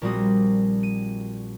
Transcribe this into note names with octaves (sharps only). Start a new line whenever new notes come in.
A#1 A#2 G3 C4 F#4 D#6
D#7